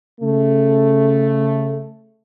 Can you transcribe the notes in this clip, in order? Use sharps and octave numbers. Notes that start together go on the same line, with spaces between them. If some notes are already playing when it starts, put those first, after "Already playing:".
C#3 A3